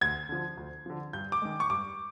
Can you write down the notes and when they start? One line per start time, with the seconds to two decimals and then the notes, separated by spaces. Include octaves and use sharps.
0.01 D2 G#6
0.29 D3 F3
0.57 D2
0.86 D3 F3
1.13 G2 G6
1.32 D6
1.42 D#3 G#3
1.60 C#6
1.70 G2 D6